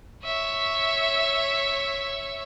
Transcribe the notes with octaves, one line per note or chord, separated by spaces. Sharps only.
C#5 E5